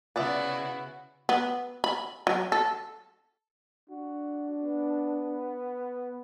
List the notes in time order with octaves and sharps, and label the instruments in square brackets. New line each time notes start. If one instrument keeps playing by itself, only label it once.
[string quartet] C#3 E4 F#4 [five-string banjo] B3 D5 E5
[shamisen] B3
B5
F#3
A4
[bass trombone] D4 [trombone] F#4
[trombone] B3